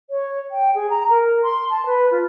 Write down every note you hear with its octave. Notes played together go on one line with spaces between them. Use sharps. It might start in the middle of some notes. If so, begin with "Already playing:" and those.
C#5
G5
G#4
A#5
A#4
C6
A5
B4
F4